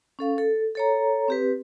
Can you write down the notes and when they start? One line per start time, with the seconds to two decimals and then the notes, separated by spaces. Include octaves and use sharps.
0.19 C#4 A4 F5
0.38 A4
0.75 A4 C#5 A#5
1.28 C4 G4 B4